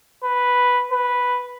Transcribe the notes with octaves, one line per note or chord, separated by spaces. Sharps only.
B4
B4